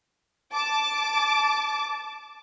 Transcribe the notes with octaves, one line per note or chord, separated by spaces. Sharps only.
A5 D6